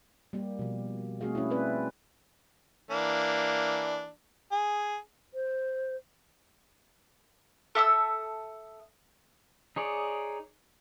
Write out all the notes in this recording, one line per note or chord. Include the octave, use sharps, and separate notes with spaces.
G3 A#3 G4
B2 F3
A3 C4 F#4 G#4 F5
C#4 E4
C4 C#4 B4 D5 E5
E3 A#3 D4
G#4
C5
A4 E5 D#6 E6
D#4 G#4 C#5 D5